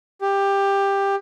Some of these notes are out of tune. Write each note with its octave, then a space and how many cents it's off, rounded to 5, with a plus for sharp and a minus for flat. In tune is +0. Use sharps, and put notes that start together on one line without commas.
G4 +15